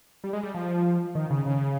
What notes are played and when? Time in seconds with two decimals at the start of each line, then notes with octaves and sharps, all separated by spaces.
0.24 G3
0.33 G#3
0.43 G3
0.54 F3
1.15 D#3
1.30 C#3
1.46 C#3